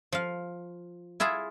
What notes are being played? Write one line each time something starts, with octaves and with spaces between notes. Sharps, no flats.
F3 F5
E4 F4 G#4 E5